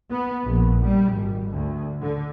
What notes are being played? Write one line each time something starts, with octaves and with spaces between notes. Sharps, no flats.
B3
A#1
G3
G#1
D2
D3